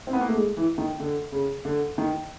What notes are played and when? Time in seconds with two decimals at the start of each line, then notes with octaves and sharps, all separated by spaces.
0.07 C4
0.13 B3
0.21 A#3
0.28 A3
0.35 G#3
0.57 E3
0.78 D#3
1.00 D3
1.32 C#3
1.65 D3
1.98 D#3